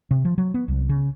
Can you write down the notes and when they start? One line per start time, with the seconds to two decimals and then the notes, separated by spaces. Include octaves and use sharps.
0.11 C3
0.25 F3
0.38 F#3
0.54 B3
0.68 C2
0.89 C#3